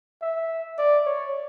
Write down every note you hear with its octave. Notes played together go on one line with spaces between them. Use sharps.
E5
D5
C#5